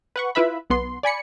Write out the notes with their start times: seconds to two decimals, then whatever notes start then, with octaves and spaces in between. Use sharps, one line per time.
0.16 B4 F#5 C#6
0.35 E4 F4 B4 E5 B5
0.70 B1 B3 C6
1.03 D5 G#5 B5 C#7